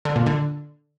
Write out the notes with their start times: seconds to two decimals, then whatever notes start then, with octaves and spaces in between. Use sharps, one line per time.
0.05 D3
0.16 A#2
0.26 D3